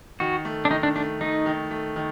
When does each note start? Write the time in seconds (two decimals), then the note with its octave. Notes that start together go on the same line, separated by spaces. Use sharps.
0.20 D#3 F#4
0.45 A3
0.65 D4
0.70 D#3 D#4
0.83 D4
0.95 A3 D4
1.21 A3 D#4
1.46 D#3
1.71 A3
1.96 D#3